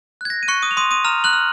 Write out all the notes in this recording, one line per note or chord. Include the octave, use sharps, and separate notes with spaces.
F#6 G#6
A#6
D#7
C#6 F#6 C#7
D#6 D#7
F7
C6 D#6 D#7
D#6 D#7
A#5 F6 F7
F#6 F#7
F6